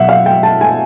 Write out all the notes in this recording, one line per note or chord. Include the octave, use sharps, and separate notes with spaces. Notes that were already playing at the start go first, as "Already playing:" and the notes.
Already playing: B2 F#3 E5 F#5
F5
G5
A5
G#5